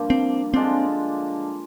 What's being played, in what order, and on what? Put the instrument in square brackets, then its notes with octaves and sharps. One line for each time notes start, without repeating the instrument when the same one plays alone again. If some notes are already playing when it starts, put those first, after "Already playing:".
Already playing: [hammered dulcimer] G2 F3 A#3
[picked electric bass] C4
[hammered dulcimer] D3 G#3 D4 F4 [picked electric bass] C4